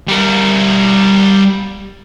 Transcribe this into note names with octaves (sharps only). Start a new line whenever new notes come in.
G3 A#4